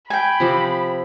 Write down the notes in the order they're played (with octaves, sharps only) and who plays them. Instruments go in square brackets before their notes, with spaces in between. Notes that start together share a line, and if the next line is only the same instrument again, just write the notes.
[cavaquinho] G5 G#5 [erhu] B5
[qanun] C3 F3 D6